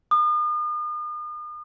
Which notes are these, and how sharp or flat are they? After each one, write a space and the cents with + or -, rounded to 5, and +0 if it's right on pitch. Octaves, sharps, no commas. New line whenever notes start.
D#6 -40